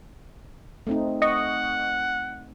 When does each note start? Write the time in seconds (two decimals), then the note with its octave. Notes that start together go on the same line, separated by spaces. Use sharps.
0.87 A3 C4 D#4
1.22 D#5 F#5 C#6